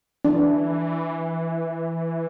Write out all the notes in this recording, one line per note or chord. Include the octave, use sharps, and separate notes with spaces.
E3 D4